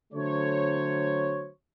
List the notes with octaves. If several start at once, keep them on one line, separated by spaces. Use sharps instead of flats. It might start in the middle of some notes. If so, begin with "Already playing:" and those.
D3 F#3 A3 C5 C#5